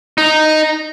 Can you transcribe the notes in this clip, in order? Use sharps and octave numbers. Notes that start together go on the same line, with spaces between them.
D#4